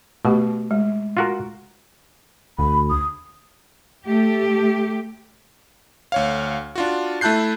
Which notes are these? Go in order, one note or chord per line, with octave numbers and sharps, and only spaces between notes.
B2 A3 G4
G#3
F4 F#4 A#4
D2 B5
D#6
A3 G4
D2 C#5 F5
D4 F4 F#4
A3 E4 A5 F#6 G6 C7